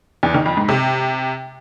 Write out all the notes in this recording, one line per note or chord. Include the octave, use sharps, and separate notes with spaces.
E2
D#3
F2
G#2
C3